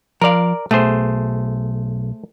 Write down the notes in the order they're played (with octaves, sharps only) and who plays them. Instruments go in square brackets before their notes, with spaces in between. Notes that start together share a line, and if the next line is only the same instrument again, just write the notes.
[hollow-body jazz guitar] F3 F5 [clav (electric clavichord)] A#4 D5
[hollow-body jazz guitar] B1 [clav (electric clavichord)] A3 G#4 C5